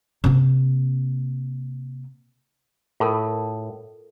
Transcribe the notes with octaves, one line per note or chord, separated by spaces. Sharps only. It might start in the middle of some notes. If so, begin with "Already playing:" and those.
C3 A#3
A2 F4 A4 A#4